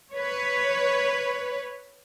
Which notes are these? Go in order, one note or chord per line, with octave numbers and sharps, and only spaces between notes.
B4 C#5